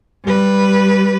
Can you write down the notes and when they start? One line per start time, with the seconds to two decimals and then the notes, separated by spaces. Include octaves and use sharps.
0.25 G3 B4